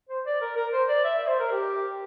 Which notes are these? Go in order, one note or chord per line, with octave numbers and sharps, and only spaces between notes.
C5
D5
A#4
A#4
C5
D5
E5
E5
C5
A#4
G4